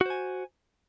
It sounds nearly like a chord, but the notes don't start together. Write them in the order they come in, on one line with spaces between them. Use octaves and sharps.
F#4 C5 G#5